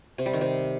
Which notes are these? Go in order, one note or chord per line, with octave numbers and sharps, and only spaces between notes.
C3
G3
D#3
C3